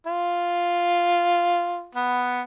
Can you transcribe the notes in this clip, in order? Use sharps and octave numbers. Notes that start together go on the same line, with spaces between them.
F4
B3